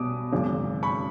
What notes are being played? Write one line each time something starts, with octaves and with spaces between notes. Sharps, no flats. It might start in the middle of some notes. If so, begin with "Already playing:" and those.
Already playing: B1 B2 G3 B3 D6 D#6
G#1 F#2 C#3
B5 C#6